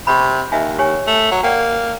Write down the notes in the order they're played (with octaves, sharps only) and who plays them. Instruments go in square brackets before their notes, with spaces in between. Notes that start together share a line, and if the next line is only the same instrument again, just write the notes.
[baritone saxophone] C3 [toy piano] G4 B5
[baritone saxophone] D#2 [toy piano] D#5 E5 G#5
[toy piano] G4 C#5 G#5
[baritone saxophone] A3
F#3
[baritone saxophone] A#3 [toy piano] D5 F#5 G5